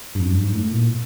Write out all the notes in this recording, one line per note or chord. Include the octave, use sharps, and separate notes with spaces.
G2
F2
F#2
G2
G#2
A2
A#2